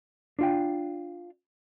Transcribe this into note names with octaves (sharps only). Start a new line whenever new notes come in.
D4 F4 G5